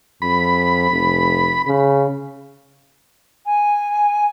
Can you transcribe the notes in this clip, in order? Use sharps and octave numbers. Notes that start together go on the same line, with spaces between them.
F2 B5
F1
C#3
G#5